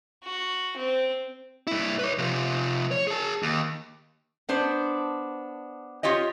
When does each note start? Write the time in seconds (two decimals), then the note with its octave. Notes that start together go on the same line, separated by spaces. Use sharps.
0.24 F#4
0.77 C4
1.67 G2 E4
1.99 B4 C#5
2.18 C3 F3
2.91 C#5
3.08 G#4 A5
3.43 D#2
4.49 B3 D4 C5
6.03 F4 G4 C#5 D#5